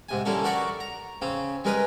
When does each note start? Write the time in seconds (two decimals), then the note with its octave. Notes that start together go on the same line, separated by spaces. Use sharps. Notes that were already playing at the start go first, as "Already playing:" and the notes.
0.09 G#2 C3 G#5
0.25 D3 G3 A#3 C#4 E4 A4
0.44 F#4 A#4 D5 E5 F#5 C#6
0.80 A#5
1.22 C#3 C4 C#4
1.64 G3 G#3 G#4 A#4 B4 D#5